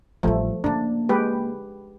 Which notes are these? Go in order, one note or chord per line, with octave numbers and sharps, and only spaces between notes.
A1 F3 G3 A3
C#3 A#3 D4
G#3 G4 B4